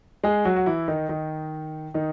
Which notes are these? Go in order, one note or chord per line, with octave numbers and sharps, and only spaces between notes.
G#3 G#4
F#3 F#4
F#4
E3 E4
D#3 D#4
D#3 D#4
D#3 D#4